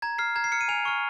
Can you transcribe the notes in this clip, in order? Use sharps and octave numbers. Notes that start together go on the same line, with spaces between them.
A#5 G#6
F6 C7
A#5 G#6
C7
F6 C#7
D#7
G#5 F7
C#6 F6